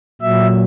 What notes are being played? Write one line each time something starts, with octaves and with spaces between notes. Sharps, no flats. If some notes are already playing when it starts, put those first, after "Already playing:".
A#2 F#3 E5